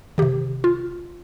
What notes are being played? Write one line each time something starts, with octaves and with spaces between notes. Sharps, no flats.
C3 D#3 G4
F4